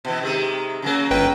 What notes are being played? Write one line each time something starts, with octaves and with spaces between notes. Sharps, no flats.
B2 E3
C3 D#3 G#3
C#3 F#3 A#3
G1 B4 G5